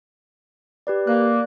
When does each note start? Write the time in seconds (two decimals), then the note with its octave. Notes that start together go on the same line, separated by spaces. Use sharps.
0.87 G4 B4 D5
1.07 A#3 A#4 D5 F#6